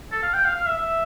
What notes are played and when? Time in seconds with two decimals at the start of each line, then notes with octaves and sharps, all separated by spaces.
0.12 A4
0.23 F5
0.34 G5
0.45 F5
0.56 F5
0.67 E5
0.78 E5